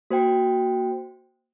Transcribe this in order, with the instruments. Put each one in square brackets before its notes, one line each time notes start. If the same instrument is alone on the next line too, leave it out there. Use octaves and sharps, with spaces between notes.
[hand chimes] A#3 F#4 C5 G5